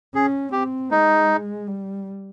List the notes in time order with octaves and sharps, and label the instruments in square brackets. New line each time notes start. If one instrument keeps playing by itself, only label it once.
[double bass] C#4 [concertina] G#4
[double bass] C4 [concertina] G4
[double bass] G#3 [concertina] D#4
[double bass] G3